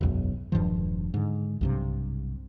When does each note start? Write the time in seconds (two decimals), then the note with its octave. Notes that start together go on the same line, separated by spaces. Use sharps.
0.01 E1 B1 F#2
0.52 E1 G2 D#3 F3
1.14 G#2 D3
1.61 B1 G2 C3